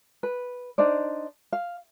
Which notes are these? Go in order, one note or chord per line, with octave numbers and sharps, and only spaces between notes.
B4
D4 D#4 C5 D5
F5